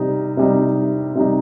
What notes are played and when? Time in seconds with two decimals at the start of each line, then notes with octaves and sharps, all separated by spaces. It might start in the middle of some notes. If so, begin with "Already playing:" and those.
Already playing: C3 G3 D#4
0.37 C3 G3 D#4
1.15 C3 G3 D#4